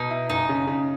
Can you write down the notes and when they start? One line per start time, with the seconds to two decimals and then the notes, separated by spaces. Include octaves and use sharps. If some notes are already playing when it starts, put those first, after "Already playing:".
Already playing: B2 D#4
0.10 E4
0.30 F#1 D#4
0.49 C#3
0.67 C#3